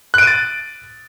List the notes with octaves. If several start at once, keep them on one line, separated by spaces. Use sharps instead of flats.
F#6 A6 D7 D#7